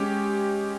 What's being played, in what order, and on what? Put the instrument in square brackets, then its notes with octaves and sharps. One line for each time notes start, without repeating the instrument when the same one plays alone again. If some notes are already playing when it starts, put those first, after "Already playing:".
Already playing: [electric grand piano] G#3 C#4 G4